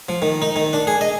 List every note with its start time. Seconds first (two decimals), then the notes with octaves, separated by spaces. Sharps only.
0.09 F3
0.22 D#3
0.42 D#4
0.56 D#3
0.73 D4
0.87 G#4
1.01 D#5